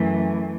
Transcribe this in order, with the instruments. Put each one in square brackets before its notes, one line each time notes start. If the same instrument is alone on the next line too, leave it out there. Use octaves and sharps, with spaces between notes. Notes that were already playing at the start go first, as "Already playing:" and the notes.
Already playing: [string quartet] F#2 E3 A3